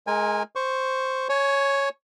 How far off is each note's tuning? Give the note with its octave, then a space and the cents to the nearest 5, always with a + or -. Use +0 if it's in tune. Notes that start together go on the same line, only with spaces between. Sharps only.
G#3 +20 A#4 +0 G#5 -20
C5 +0 C#6 +0
C#5 +0 G#5 +25